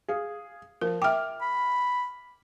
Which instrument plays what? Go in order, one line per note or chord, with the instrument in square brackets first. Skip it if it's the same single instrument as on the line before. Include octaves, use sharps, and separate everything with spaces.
[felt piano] G#4 F5
[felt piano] F3 [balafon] A#4
[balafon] E5 G5 [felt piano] D6 F6
[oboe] B5